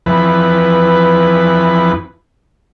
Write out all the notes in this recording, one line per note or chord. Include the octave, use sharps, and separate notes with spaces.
F2 E3 B4